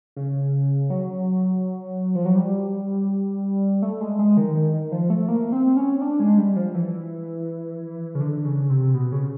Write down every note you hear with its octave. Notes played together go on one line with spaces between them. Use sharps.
C#3
F#3
F3
F#3
G3
A3
G#3
G#3
D#3
D#3
D#3
F3
A3
A#3
C4
C#4
D4
G#3
G3
F3
E3
C#3
D3
D3
C#3
C3
B2
C#3